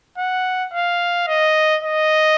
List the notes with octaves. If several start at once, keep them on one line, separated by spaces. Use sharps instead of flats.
F#5
F5
D#5
D#5